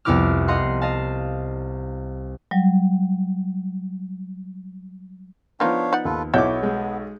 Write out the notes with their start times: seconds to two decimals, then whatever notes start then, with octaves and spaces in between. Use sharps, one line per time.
0.05 C2 F2 B3 E4 D6 F6
0.48 D#5 F5 F#5 C6
0.81 D#5 F5 A5
2.51 F#3 G3
5.60 F3 A#3 B3 D4 D#4 F4 C#5 F5
5.93 D#4 D5 F#5
6.05 D#2 F4 A4 B4
6.34 B1 B2 B3 E4 F#4 C#5 D6 G6
6.63 G#3